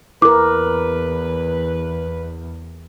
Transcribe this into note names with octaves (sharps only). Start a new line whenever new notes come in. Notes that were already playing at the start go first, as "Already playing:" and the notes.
E2 E4 A#4 B4 D6